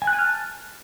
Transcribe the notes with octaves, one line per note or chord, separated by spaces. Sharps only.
G#5
F#6
G#5
F6
A5